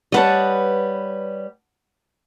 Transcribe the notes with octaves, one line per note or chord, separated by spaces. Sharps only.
G3 B4 C#5 D#5 F#5 A5